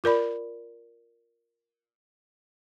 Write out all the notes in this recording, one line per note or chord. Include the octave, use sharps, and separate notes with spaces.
F4 A#4 D5 B5